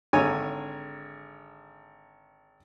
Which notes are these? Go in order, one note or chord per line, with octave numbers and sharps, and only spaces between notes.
G#1 D3 C#5 G#5 A#5